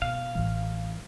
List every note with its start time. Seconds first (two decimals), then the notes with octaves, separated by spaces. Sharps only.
0.02 B2 F5
0.35 A1 A2 C#3 E3 G3